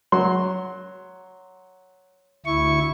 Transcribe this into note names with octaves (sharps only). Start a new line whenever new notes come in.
F#3 C6
D2 E4 C#6